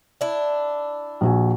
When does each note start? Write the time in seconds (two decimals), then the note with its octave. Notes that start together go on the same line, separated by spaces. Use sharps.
0.21 D4 E4
1.21 A#1 F#4 G#5